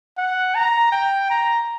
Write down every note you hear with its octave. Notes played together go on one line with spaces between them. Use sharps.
F#5
A#5
G5
A#5